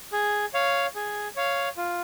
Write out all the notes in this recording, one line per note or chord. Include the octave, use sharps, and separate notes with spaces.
G#4
C#5 F5
G#4
C#5 F5
F4